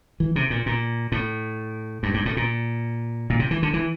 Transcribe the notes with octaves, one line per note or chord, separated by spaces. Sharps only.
E3
C3
A#2
A#2
A2
G2
G2
A2
A#2
A#2
C3
E3
D3
E3